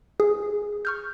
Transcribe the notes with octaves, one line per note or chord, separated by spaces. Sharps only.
G#4
C#6 F6 G6